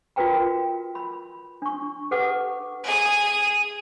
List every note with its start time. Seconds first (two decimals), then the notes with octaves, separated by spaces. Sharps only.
0.16 F4 F#4 A#4 B4 G5 A#5
0.95 B5
1.62 D4 C#6
2.11 G4 A4 B4 F#5 D6
2.84 G#4 D#6